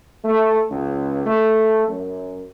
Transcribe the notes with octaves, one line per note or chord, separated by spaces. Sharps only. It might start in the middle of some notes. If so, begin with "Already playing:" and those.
A3
C#2
A3
F#2